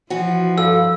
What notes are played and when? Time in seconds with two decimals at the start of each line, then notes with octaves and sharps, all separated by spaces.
0.10 E3 F3 F#4
0.58 G2 A4 F5 E6